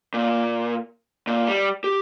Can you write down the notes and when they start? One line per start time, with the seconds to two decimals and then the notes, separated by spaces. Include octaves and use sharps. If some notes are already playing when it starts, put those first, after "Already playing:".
0.14 A#2
1.27 A#2
1.47 G3
1.84 G4